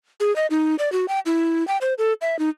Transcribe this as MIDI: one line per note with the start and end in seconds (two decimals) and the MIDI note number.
0.20 0.34 68
0.36 0.46 75
0.50 0.75 63
0.79 0.91 74
0.92 1.06 66
1.08 1.19 79
1.26 1.66 64
1.68 1.78 79
1.81 1.94 72
1.98 2.13 69
2.21 2.39 76
2.39 2.49 63